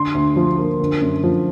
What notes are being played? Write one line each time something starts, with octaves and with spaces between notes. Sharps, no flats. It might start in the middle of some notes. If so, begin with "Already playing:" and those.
Already playing: D3 C6
D2
F3
A#3
D3
F#2
F3